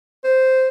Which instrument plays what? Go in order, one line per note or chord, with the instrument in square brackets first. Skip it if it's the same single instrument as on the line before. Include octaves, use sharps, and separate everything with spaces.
[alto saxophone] C5